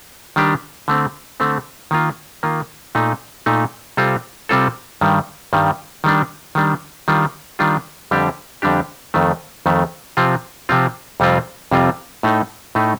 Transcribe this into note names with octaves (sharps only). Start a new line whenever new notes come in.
D#3 G3 D4 G4
D3 A3 C4
D3 A3 C4
D#3 A#3 F4
D#3 A#3 F4
A#2 A3 D#4
A#2 A3 D#4
C3 G3 C4 F4 A4
C3 G3 C4 F4 A4
G2 D#3 G3
G2 D#3 G3
D#3 G3 D4
D#3 G3 D4
D#3 G3 D4 F4
D#3 G3 D4 F4
F2 D3 G3 D4 G4
F2 D3 G3 D4 G4
F2 D#3 A3
F2 D#3 A3
C3 F3 C4 F4
C3 F3 C4 F4
F2 C3 G3 C4 F4
F2 C3 G3 C4 F4
A2 A3 D#4
A2 A3 D#4